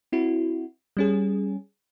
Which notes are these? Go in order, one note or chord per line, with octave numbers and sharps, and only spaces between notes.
C4 E4 F#4
G3 C#4 G#4